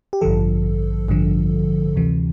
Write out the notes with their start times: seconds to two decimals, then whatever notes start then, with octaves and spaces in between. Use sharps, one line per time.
0.13 G4
0.21 A1 G2 D3 F3 A4
1.08 A1 G2 D3 F3
1.96 D2 C3 E3